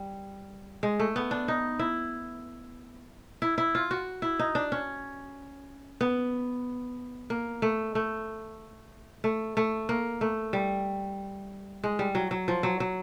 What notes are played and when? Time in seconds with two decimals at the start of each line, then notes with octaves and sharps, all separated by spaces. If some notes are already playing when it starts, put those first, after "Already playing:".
Already playing: G3
0.83 G#3
0.99 A3
1.16 B3
1.31 D4
1.48 D#4
1.79 E4
3.42 E4
3.58 E4
3.75 F4
3.91 F#4
4.22 E4
4.39 D#4
4.55 D4
4.72 C#4
6.01 B3
7.30 A#3
7.62 A3
7.95 A3
9.24 A3
9.57 A3
9.89 A#3
10.21 A3
10.53 G3
11.83 G#3
11.99 G3
12.15 F#3
12.31 F#3
12.48 F3
12.63 F#3
12.80 F#3